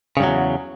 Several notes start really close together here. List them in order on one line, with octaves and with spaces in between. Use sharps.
C#3 G2 F#3 E2